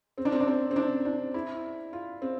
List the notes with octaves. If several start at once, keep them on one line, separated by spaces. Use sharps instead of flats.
C4
D4
C4
D4
C4
C4
D4
D4
E4
F4
C4